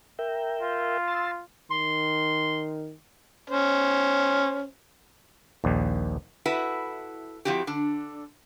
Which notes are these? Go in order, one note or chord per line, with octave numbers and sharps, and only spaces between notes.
A#4 E5 G5
F4
C6 E6 A6
D#3 C6
C#4 C5
A#1 D#2
E4 F#4 A4 B4 E5
F3 C4 E4 F#4 G4
D3 D4